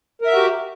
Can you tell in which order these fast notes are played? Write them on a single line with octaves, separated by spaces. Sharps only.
A#4 E5 F#4 G4